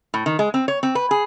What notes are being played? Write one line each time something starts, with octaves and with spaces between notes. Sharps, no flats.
A2
D#3
G#3
C4
C#5
C4
B4
G#4